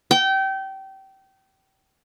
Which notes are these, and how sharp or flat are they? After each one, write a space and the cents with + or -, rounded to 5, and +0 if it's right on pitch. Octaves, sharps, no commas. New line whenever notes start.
G5 -25